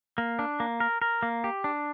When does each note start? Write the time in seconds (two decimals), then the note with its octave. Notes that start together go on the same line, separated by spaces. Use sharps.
0.18 A#3
0.39 D4
0.60 A#3
0.80 A#4
1.02 A#4
1.23 A#3
1.44 G4
1.64 D4